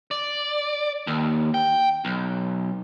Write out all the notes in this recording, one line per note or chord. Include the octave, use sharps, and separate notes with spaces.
D5
D#2
G5
B1